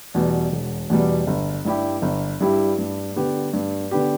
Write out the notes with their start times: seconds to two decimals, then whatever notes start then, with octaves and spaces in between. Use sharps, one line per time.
0.14 E2 B2 G3
0.52 E1
0.90 E2 B2 G3
1.27 G1
1.65 G2 G3 E4 G4
2.02 G1
2.40 G2 G3 E4 G4
2.78 G2
3.16 D3 B3 G4
3.53 G2
3.91 D3 B3 G4